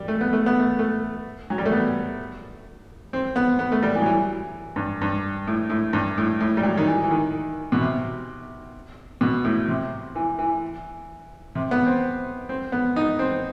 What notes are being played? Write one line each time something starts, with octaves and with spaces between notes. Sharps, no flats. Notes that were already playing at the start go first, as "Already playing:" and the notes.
Already playing: G3
A3
B3
A3
B3
A3
A3
F#3
G3
A3
B3
C4
B3
B3
A3
G3
E3
F#3
E3
G2
G2
A2
A2
G2
A2
A2
G3
F#3
D#3
E3
E3
D#3
B2
C3
B2
A2
C3
E3
E3
C3
B3
C4
C4
B3
D#4
C4